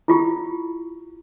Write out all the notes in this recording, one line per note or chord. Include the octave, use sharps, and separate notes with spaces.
E4 F4 G4